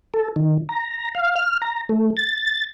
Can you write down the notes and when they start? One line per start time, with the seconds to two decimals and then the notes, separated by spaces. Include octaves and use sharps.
0.14 A4
0.36 D#3
0.69 A#5
1.15 F5
1.36 F6
1.62 A#5
1.89 A3
2.17 A6